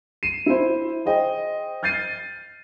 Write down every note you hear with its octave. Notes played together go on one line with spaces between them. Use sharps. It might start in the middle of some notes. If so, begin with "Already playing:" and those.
C7 D#7 E7
E4 C5
G#4 C5 D#5 G5
F6 G6 A6 C7 D#7